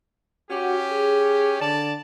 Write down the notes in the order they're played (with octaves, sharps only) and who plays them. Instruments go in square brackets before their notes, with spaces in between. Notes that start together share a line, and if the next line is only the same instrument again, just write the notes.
[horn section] C#4 G4 [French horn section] F#4
[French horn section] G#4
[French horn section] D3 [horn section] D5 A5